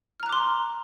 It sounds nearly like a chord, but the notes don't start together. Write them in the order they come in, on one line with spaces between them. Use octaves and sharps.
F6 A#5 F#6 D6 C6